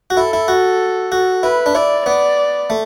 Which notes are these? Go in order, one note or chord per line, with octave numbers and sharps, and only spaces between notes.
F#4
E4 A4
E4
F#4
F#4
E4 B4
D4
E4 D5
B3 D5
A3